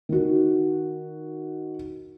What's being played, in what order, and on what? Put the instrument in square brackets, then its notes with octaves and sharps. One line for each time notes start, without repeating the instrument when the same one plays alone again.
[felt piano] D#3 F#4